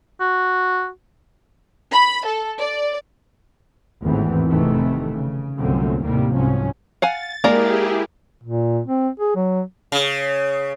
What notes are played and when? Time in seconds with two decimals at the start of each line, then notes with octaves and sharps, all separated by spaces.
0.21 F#4
1.93 B5
2.26 A4
2.59 D5
4.03 G#1 E2 A2 D#3 E3 C4
4.49 F1 C3 D#3 E3 A3
5.12 C#3
5.58 C2 F#2 A#2 D3 A3 C4
6.04 D#2 A2 C3 D#3 G3 A#3
6.35 C2 G#2 F3 F#3 C#4
7.02 F5 F#5 G#5 A6
7.44 G#3 A#3 E4 G4 G#4 A#4 D5
8.43 A#2
8.87 C4
9.20 G#4
9.36 F#3
9.92 C#3